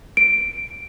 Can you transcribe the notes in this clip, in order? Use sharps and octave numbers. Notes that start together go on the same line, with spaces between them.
D7